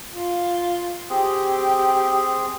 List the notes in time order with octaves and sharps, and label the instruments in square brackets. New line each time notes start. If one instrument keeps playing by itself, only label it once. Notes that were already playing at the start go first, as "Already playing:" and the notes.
[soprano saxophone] F4
[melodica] C4 G#4 [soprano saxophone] G4